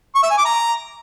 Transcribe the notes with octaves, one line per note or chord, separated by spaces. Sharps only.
C#6
E5
G#5
D6
A#5